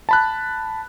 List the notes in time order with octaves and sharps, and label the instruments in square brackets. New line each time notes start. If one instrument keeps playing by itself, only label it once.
[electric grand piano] A5 B5 F#6